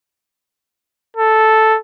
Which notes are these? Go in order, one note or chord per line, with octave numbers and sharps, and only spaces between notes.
A4